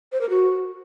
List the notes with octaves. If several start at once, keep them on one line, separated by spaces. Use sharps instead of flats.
C5
A#4
F#4